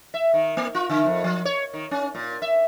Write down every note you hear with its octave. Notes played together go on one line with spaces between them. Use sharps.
E5
D#3
A#3
F4
D3
F2
F3
C#5
D#3
C#4
A#2
E5